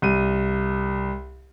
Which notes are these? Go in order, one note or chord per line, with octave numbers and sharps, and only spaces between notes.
C2 D#7